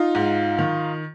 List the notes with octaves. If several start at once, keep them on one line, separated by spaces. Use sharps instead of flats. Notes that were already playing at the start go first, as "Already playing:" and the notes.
Already playing: D#4 F4
G#2
D#3